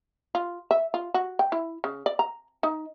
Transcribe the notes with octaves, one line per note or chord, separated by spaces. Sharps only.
F4
E5
F4
F#4
G5
E4
C#3
D5
A#5
D#4